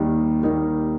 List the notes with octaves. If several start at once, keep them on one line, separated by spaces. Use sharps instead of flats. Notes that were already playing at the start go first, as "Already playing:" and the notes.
Already playing: D#2 D#3 G3 A#3 D#4
D#2 D#3 G3 A#3 D#4